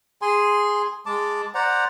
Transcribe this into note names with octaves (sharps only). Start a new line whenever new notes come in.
G#4 G#5 C6
G#3 A5 D6
C5 D5 F#5 A#5